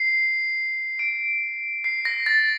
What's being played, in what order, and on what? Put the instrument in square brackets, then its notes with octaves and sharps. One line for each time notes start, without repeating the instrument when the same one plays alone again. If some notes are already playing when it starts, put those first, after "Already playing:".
Already playing: [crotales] C7
D7
C7
A#6
A6